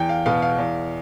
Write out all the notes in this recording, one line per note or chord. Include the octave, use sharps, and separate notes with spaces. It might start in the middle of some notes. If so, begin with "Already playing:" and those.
Already playing: E2 G5
F5
B2 B3 F5
F5
E2